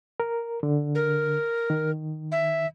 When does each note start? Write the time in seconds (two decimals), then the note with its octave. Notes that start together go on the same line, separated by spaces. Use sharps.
0.20 A#4
0.63 D3
0.95 A#4
1.70 D#3
2.32 E5